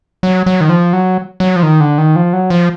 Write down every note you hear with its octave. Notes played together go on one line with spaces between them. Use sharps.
F#3
F#3
D#3
F3
F#3
F#3
F3
D#3
D3
D#3
F3
F#3
F3